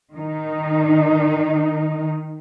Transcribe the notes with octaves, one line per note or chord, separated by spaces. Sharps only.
D#3 D#4